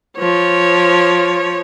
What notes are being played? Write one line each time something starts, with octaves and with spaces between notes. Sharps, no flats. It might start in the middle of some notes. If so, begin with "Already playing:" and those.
F3 C#5